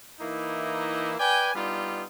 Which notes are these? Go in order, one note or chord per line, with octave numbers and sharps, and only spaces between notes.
E3 A#3 D#4 E4
B4 D5 G5 G#5
G3 B3 D4 D#4 F4